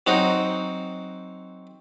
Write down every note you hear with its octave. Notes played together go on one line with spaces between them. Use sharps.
F#3 C4 D#4 F#4